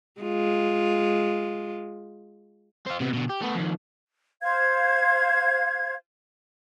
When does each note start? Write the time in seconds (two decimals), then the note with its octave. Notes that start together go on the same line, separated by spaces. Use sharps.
0.21 G#3 F4
2.86 C4 F4
3.00 C3 B3
3.14 B2 D3
3.30 G4
3.42 A3 B3
3.55 F2 D#3
4.42 C5 F5 G#6